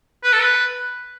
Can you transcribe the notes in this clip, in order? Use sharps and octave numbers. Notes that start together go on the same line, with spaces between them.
B4
A4
B4